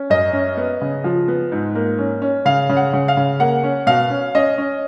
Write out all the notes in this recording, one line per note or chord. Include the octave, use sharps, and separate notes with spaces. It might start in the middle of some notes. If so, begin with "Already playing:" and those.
Already playing: C#4
F#2 D#5
C#4
B3
C#3
F3
B3
G#2
A#3
C#4
C#4
C#3 F5
C#3
F#5
C#3
F5
C#3
A#3 F#5
C#4
B2 F5
C#4
C#4 D#5
C#4